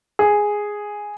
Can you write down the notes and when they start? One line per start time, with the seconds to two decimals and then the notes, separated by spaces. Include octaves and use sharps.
0.19 G#4